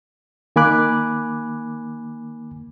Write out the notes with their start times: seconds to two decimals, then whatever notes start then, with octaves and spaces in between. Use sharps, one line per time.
0.56 D#3 A#3 G#5 B5 D6 F#6